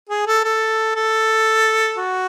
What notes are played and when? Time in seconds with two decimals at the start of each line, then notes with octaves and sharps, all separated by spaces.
0.10 G#4
0.27 A4
0.44 A4
0.96 A4
1.97 F#4